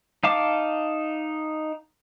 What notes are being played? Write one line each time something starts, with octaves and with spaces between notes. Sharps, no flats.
D#4 F5 A5 D6